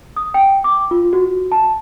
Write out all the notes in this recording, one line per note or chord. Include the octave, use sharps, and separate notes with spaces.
D#6
G5
D6
F4
F#4
A5